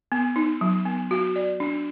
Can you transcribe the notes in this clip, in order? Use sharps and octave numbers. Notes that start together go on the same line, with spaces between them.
B3
D#4
F#3
B3
F#4
D5
D4